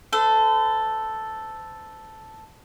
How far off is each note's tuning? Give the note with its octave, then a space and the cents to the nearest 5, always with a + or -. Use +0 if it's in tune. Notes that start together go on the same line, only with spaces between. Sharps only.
A4 +0 C5 -40